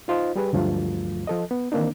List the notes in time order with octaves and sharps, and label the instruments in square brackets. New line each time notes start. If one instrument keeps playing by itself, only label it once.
[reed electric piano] D#4 F4 C5 D#5
G3 G4 G#4 B4
D2 G2 F3 F#3 A3 F4
F3 A4 D#5
B3
D#3 E3 A#3 C4 D4 D#4